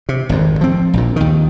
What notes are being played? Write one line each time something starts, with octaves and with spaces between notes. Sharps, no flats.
C3
G#1 F2
F3 C4
A#1 A#2
D#2 D#3